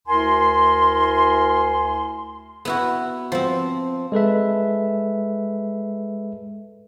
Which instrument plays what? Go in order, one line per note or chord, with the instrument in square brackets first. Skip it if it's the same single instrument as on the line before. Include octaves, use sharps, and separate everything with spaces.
[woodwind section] D2 E4 A#4 G#5 C6
[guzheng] B3 E4 F#4
F3 C4
[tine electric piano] G#3 A4 B4 E5